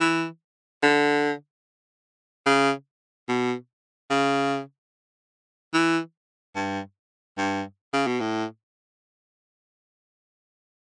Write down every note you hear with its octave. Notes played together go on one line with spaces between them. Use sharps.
E3
D3
C#3
B2
C#3
E3
G2
G2
C#3
B2
A2